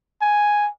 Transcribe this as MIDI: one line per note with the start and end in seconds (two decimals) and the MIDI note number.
0.21 0.69 80